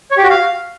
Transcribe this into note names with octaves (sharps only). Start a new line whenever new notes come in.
C#5
G4
F#4
F5